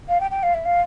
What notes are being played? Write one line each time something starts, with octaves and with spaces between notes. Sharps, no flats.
F5
G5
G5
F5
E5
F5